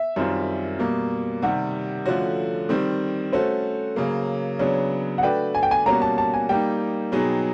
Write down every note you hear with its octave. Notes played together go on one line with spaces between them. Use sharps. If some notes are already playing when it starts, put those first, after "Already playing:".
Already playing: E5
F#2 D#3 G3 C4 F4
B2 G3 A#3
C3 D#3 G3 F#5
D3 F3 A3 C#4 F#4
D#3 G3 C4
A3 C#4 F#4 A4 C5
C#3 F#3 A#3
C#3 F#3 B3 D4 C#5
F#5
A3 D4 F#4 B4 D5 G5
G#5
G5
G#5
B2 G3 A#3 C#4 F#4 A#5
A5
A5
G#5
G3 A#3 D#4 G5
B2 F#3 B3 D#4 G#4